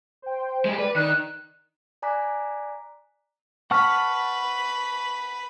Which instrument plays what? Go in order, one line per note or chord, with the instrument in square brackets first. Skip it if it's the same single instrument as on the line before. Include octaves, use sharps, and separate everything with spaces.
[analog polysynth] C5 G5
[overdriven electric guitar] G#3 G4
[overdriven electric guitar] B4 [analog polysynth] D5
[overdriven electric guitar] D#3 [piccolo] F#6
[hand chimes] D5 G#5 A#5 D6 F#6 B6
[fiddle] B4 B5 [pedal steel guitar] F#5 A5 F6 [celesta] C#6